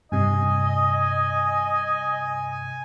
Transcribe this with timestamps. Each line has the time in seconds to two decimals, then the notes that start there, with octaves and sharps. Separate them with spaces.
0.12 G2 C3 D#5 G#5